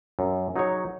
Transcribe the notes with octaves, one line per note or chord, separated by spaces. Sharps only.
F#2
F#3 D#4 G#4 C#5